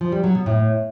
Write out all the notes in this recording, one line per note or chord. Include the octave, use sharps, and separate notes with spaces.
F3
G3
F#3
B2
A2